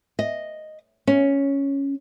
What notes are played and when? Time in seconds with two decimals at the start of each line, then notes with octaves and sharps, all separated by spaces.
0.19 D#5
1.07 C#4